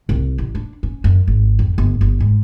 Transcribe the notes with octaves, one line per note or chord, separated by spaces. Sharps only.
C2
A1
D4
C#4
F#2
G#1
F2
G1
G1
G#2